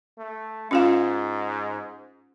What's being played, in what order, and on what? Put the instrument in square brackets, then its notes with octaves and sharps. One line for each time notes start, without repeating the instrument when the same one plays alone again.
[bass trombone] A3
[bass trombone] G#2 [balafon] C#4 F4 F5